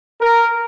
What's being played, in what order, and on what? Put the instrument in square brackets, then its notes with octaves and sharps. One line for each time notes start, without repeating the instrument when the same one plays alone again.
[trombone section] A#4